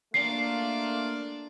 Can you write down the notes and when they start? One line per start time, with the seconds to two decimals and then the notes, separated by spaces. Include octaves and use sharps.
0.14 A3 A#3 D4 F4 C7